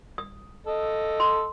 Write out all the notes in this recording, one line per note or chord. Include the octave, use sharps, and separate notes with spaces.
D#6
A4 D#5
C6